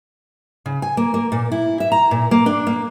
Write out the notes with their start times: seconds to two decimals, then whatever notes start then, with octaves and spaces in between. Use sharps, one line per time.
0.66 C#3
0.82 G#5
0.97 A#3
1.14 A#3
1.32 A#2
1.52 E4
1.80 E5
1.92 A#5
2.11 A#2
2.31 A#3
2.46 D4
2.67 A#3